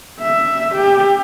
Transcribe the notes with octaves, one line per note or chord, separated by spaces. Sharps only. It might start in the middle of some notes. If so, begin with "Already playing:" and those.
E5
G4